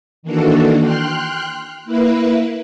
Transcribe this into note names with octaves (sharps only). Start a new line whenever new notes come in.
D#3 E3 A#3 D4 F#4 A4
G5 C6 F6 F#6
A#3 E4 B4